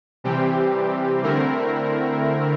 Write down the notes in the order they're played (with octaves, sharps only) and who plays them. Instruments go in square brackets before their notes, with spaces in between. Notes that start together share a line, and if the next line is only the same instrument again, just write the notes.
[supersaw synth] C3 E3 G3 C4 G4
D3 A3 C4 E4 A#4